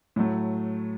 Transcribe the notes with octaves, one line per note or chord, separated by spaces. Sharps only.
A2 F#3 A3